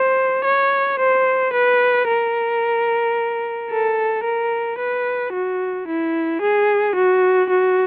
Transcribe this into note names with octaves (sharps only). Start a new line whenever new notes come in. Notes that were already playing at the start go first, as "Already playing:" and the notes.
Already playing: C5
C#5
C5
B4
A#4
A4
A#4
B4
F#4
E4
G#4
F#4
F#4